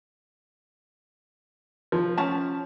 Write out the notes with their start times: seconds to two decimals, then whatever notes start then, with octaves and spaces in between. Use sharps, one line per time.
1.92 F3
2.17 C#4 A5